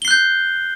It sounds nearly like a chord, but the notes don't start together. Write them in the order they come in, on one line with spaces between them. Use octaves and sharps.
G7 C7 F#6 G6